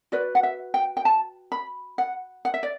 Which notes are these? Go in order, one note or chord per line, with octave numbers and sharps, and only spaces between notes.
F#4 B4 D5
F#5
E5
G5
G5
A5
B5
F#5
F#5
E5
D5